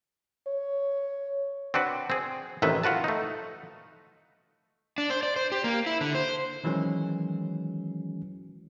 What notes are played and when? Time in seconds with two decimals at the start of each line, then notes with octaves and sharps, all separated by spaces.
0.47 C#5
1.74 C4 D4 F#4 B4
2.10 C4 G#4
2.62 A1 C3 D#3 A4 B4 E5
2.83 F4 F#4 B4 A5
3.04 A3 D#4
4.98 D4
5.10 C5
5.23 D5
5.36 C5
5.52 G4
5.64 A#3
5.86 E4
6.01 D3
6.15 C5
6.64 D#3 E3 F#3 G#3 C#4